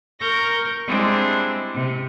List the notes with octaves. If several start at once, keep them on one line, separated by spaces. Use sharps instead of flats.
A#4 C#6 G6 A#6
G3 G#3 C4 D4 E4 G#4
C3